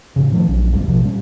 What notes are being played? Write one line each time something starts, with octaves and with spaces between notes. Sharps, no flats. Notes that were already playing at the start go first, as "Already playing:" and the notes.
A2 C#3
D#3 F3 A3
A#1 F#3 C#4
G1 D#2 G3
A1 B2 F3
A#2 G3 C#4